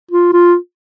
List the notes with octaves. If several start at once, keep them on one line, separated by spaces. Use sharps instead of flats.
F4
F4